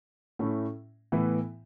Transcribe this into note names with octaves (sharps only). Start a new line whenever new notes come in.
A2 A3 C#4 E4
A2 E3 B3 E4